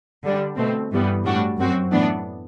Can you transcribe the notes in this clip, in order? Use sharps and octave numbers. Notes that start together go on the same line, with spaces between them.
D3 G3 D4
B2 A3 C4
G2 E3 G3 B3
A2 G3 D4 F#4
F#2 F#3 C4 F#4
A2 E3 B3 D4